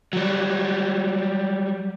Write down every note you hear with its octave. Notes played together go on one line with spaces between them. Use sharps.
F#3 G3